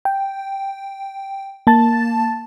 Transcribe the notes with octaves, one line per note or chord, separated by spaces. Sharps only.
G5
A#3 A5 A6